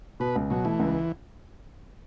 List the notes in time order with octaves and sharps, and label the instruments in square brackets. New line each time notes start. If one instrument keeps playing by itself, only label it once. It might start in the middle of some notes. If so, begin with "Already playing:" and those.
[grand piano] B2 [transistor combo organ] B4
[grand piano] C#2
[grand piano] B2 [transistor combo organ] F#3
[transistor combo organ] E3 [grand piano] A3
[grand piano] C#2